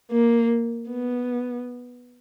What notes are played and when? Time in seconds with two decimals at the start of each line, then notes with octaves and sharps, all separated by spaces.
0.11 A#3
0.88 B3